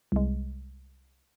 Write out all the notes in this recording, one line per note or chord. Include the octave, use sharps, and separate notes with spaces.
C2 G#3